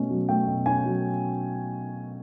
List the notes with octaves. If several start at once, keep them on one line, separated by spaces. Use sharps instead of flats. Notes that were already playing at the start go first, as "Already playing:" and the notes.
Already playing: B2 A3 C#4
F#3
A3 G5
B2
C#4 G#5
F#3